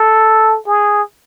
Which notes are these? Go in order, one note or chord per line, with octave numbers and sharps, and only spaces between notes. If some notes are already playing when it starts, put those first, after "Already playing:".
Already playing: A4
G#4